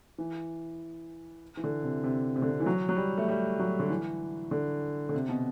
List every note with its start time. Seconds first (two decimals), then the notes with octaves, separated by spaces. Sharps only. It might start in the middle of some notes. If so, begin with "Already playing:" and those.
0.18 E3
1.57 E3
1.64 D3
1.83 C3
2.04 C3
2.36 C3
2.42 D3
2.51 C3
2.60 E3
2.66 F#3
2.89 F#3
2.96 G3
3.18 A3
3.28 G3
3.59 F#3
3.79 D3
3.90 E3
4.51 D3
5.09 D3
5.14 C3
5.29 B2